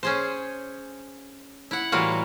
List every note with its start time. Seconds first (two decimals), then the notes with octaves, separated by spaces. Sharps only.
0.03 C#4 G#4 C5
1.71 E4 F#5
1.92 A2 E3 G3 A#3 F4 F#4